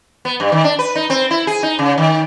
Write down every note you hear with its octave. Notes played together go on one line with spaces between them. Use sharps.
B3
G2
D#3
D4
B4
D#4
C4
E4
G#4
D#4
C#3
D#3